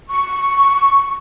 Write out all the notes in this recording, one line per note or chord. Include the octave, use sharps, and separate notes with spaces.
C#6